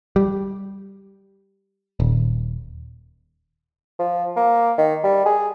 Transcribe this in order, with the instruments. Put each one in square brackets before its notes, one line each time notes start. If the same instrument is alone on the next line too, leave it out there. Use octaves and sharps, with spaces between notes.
[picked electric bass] G3
D#1
[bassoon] F3
A#3
D#3
G3
G#4